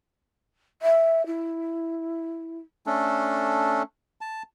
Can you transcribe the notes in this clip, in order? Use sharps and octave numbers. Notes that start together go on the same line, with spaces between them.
E5
E4
A3 C#4 D4 A4
A5